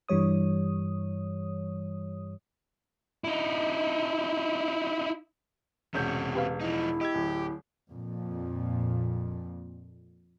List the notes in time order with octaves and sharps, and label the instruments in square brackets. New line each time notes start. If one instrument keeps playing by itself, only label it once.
[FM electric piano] G2 E3 G3 C#5 D#6
[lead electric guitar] D#4 E4
[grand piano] E1 C#4 G6 [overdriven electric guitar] C3 F#4
[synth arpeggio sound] G4 B4 F5
[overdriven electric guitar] F3 D#4 [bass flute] E4
[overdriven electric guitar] G4 [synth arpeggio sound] D#5 E6 G#6
[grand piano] D1
[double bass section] F2 A#2